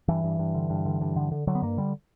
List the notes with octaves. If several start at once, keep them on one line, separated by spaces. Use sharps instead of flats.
G2 E3
G2
G2
D3
G2
D3
G2
D3
D3
D3 F#3
B3
G2 A#3
D3 G3